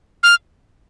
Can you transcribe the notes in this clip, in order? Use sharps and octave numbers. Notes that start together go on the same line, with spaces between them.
F6